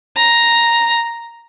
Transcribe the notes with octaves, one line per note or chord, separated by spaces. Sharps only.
A#5